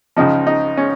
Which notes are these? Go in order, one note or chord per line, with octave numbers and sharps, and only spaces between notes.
C#2 C#3 F3 D#4
D#4
C#4